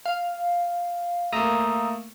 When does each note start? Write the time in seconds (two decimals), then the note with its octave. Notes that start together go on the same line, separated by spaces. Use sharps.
0.06 F5
1.32 A3 A#3 A#5 D#6 E6